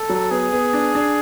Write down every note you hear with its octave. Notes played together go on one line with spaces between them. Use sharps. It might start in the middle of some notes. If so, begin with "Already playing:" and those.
Already playing: A4
F#3
B3 G#4
B3
D4
D4